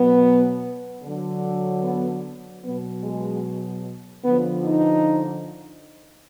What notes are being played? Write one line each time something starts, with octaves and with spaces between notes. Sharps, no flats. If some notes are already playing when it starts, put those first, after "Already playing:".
Already playing: B2 F#3 B3
D3 F#3
B3
B2 F#3 B3
G#3
D3 F3 B3
D#4